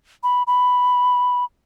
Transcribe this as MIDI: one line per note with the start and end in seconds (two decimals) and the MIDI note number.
0.23 0.43 83
0.47 1.44 83